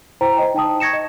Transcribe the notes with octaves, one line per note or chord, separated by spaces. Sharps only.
E4 C5 G5 A#5
C5 D#5 G5
D#4 G5 A5 D#6
C#6 G#6 A#6 C#7 E7
D#5